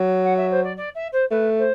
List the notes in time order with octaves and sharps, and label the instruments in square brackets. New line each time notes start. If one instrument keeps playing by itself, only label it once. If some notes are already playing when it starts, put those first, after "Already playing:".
Already playing: [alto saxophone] F#3
[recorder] F#5
E5
C5
D5
D5
E5
C5
[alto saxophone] A3 [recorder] B4
[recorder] C5